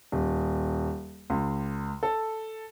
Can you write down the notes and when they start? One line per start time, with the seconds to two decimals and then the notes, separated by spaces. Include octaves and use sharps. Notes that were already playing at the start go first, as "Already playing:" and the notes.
0.12 D#1
1.30 C#2
2.03 A4